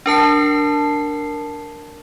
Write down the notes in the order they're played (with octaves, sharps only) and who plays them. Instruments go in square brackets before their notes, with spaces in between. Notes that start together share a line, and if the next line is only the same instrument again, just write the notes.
[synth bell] D4 A#4 A5 C7